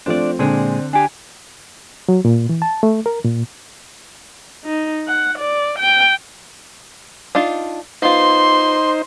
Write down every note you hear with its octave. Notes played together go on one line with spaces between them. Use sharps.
F3 A3 C4 D4 D5
A#2 D3 G#3 C4 D4 G#4 D5
D4 G4 G#5
F#3
A#2
E3
A5
A3
A#4
A#2
D#4
F#5
D5
G5
D4 D#4 F4
B3 D#4 F4 C5 C6